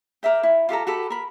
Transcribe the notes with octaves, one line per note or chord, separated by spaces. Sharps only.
A#4 D5 E5 G5
E4
F4 G4 A4 A#5
F#4 G4 A4 B5
A#4 B5